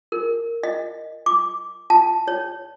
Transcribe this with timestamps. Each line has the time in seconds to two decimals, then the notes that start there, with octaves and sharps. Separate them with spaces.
0.12 A#4
0.63 D#5
1.26 D6
1.90 A5
2.28 C#5